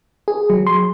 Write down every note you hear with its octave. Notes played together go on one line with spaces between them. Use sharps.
G#4
F#3
C6